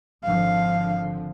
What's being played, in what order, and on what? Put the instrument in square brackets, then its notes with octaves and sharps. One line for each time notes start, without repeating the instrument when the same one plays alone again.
[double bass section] G#1 D3 F3 [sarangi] F5